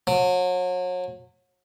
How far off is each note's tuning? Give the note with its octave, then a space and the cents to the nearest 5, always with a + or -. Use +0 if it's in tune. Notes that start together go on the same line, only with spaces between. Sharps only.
F#3 -35